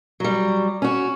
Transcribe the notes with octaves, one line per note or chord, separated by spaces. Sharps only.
F#3 G3
C#4 F#4